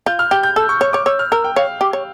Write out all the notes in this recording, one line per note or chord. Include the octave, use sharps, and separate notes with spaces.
F4 G6
F6
G4 G6
G6
A4 E6
C#6
C#5 C#6
C#5 D6
C#5 E6
F6
A#4 E6
G5
C#5 F5
G4
C#5